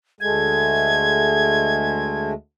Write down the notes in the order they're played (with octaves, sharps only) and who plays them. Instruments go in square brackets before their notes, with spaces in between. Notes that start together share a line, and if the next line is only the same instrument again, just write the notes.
[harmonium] D2 G#3 A3 [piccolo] G#6